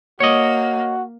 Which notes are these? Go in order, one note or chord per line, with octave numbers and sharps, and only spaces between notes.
A#3 F#4 C#5 D#5